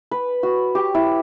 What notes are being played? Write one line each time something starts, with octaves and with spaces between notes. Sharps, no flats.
B4
F#4
G4
E4